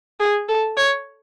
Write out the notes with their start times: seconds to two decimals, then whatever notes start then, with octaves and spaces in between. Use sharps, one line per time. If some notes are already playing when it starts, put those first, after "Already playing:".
0.20 G#4
0.48 A4
0.77 C#5